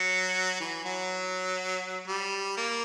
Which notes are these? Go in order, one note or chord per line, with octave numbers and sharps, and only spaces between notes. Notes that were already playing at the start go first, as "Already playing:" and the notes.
Already playing: F#3
E3
F#3
G3
A#3